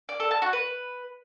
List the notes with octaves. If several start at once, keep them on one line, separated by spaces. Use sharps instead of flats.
D5
A4
A5
F#4
B4